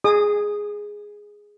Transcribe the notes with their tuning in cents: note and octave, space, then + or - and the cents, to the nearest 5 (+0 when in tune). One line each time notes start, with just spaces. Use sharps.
G#4 +0 D#5 -30 D#6 -30